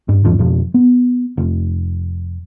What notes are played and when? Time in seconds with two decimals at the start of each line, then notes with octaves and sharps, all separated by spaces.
0.09 G2
0.25 E2 G2 E3 F3
0.39 F2 B2 F3
0.74 B3
1.37 F1